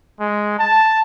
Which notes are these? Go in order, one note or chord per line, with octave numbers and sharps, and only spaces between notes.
G#3
A5